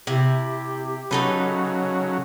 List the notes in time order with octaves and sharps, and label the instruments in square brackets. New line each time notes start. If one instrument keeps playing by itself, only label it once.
[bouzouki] C3 E4 [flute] G4
[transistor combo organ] C#3 F#3 [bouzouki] D#4 A4 B4